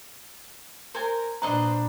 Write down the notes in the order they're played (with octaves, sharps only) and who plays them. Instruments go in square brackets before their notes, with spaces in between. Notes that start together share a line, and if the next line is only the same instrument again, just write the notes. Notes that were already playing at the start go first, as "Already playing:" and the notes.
[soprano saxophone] A#4 [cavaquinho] C5 G#5
[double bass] A#2 D4 [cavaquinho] B4 D#5 C6 [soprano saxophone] C5 [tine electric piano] A#5